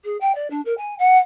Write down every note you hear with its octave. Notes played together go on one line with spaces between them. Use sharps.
G#4
G5
D5
D4
A#4
G#5
F#5